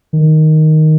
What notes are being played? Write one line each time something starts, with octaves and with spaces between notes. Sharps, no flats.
D#3